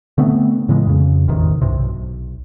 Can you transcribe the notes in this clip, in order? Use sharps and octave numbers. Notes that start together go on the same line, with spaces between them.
D3 A3 B3 C4
A2 C#3 E3 G#3
F2 C#3
A1 E2 C3 D#3
C2 G2 C3
B1